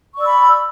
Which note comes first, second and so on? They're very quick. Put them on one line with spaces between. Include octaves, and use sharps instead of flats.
C#6 D5 E6 B5